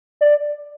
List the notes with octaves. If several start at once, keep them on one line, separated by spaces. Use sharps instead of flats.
D5